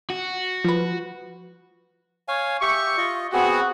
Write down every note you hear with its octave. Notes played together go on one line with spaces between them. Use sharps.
F#4
F3 B4
C#5 F5 G#5
G4 E5 C#6
F4 D#5
B3 C4 F#4 G#4